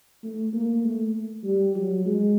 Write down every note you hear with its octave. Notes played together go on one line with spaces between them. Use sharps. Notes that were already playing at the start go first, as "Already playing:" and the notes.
A3
A#3
A3
G3
F#3
G#3